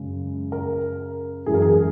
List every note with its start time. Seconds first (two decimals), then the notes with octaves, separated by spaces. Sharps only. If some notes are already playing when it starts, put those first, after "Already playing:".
Already playing: F#2 C#3 G#3
0.52 A#4
1.46 F#2 E3 G#3 G#4
1.54 A#4
1.62 G#4